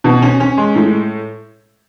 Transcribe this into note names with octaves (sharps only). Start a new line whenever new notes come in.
B2
C#4
C#4
G#3
A2